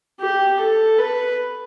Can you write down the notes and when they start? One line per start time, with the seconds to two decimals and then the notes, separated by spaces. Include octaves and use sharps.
0.20 G4
0.60 A4
0.98 B4